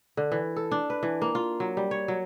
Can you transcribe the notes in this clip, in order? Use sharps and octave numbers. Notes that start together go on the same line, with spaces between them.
D3
E3
A4
D4
B4
E3
A#3
F4
F#3
G3
C#5
F#3